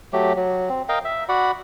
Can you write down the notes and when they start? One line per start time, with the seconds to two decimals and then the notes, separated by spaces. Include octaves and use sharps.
0.13 F#3 A3 G4
0.36 F#3
0.69 C4
0.89 A#4 D#5 F5 G5
1.05 E5
1.29 F#4 D5 F#5 B5